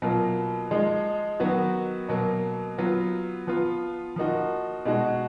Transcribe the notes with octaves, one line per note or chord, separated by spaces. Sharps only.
B2 F#3 A#3 F4
F3 G#3 D#4
D#3 F#3 B3 F#4
B2 F#3 A#3
F#3 B3 F4
F3 B3 F4
F3 A#3 D#4 F#4
B2 G#3 D#4 F#4